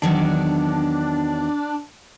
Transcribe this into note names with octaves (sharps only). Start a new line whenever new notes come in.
E2 D#3 F#3 D4